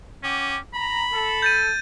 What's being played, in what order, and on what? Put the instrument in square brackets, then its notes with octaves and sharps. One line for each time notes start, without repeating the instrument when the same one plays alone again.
[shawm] C#4 [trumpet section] F#5 G5 D6
[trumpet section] A#5 [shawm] B5
[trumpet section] A4
[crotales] G6 A6 D#7